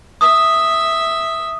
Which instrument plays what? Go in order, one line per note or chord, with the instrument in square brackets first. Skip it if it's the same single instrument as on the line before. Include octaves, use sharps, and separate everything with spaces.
[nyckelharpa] E5 [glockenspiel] D#6